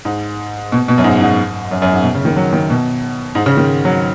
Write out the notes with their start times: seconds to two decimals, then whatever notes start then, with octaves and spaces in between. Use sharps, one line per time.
0.05 G#2
0.72 B2
0.88 B2
0.98 F#2
1.04 G#2
1.22 G#2
1.71 F#2
1.82 F#2
1.92 G#2
2.03 B2
2.15 C#3
2.25 D#3
2.37 F#3
2.53 D#3
2.70 B2
3.35 G#2
3.46 C#3
3.57 D#3
3.85 F#3